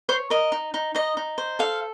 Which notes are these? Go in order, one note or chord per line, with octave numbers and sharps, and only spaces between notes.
C5 C#5 C6
A#4 D#5
D#4
D#4
D#4 D#5
D#4
C5
A4 F5